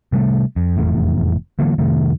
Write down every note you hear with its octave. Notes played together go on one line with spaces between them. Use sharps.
C3 G3 A3
F2
F1 E2 A2
D3 E3 F#3 A#3
F2 C3 D#3 A3